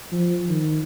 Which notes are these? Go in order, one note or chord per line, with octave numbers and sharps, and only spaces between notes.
F3
D#3